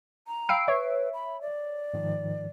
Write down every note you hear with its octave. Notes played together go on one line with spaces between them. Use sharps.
A#5
F5 G5 B5 E6 C7 D7
B4 C#5 E5
B5
D5
G#2 D#3 F3